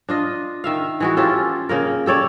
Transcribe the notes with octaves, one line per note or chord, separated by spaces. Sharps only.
D4 F4 D#5
D#3 E5 F5
E3 G#3 F#4
C#4 F4 G4 A4
C#3 A#3 A#4
G4 A4 C#5 D5